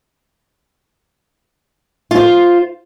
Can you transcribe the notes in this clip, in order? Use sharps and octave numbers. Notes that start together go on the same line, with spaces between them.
F4 C5